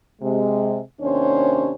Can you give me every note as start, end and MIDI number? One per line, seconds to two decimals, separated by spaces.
0.21 0.78 48
0.21 0.78 56
1.00 1.73 39
1.00 1.73 48
1.00 1.73 61
1.00 1.73 62
1.00 1.73 72
1.00 1.73 73